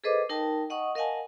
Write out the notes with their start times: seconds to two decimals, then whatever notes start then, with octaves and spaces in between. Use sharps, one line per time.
0.04 G#4 A4 B4 C5 D#5 D6
0.29 D#4 A#4 G5 A5
0.70 D#5 F#5 C#6 D#6
0.95 A#4 D#5 F5 F#5 G#5 A5